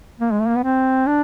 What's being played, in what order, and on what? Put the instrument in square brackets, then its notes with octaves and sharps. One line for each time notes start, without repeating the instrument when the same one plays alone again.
[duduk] A#3
G#3
A3
A#3
B3
C4
D4